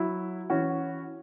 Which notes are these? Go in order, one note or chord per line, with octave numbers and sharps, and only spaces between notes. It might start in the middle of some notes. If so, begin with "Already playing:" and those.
Already playing: F#3 E4
E3 C#4 F#4